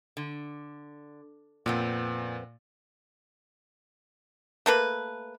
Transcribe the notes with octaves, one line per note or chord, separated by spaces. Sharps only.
D3
F2 A#2 B3 C4
A3 A#3 B4